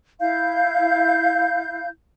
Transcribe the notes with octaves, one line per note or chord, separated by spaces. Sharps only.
E4 F5 G6